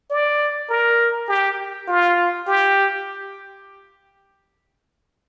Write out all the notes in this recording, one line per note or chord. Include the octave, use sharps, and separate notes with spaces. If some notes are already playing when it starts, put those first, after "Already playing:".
D5
A#4
G4
F4
G4